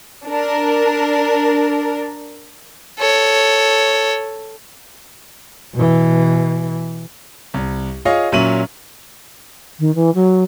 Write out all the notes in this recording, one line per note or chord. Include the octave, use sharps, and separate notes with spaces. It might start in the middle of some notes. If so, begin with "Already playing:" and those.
D4 A#4
A4 C#5
B2 E3
C2
F4 G#4 C#5 D#5 F5
A#2 F#3 C#4 E5 D#7 F#7
D#3
E3
F#3